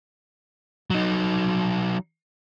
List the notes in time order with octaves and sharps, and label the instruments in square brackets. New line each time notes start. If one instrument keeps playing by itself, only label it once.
[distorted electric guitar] F#3 D#4